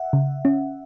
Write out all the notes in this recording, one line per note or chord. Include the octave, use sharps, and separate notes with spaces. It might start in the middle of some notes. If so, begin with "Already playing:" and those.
Already playing: E5 F#5
C#3
C#4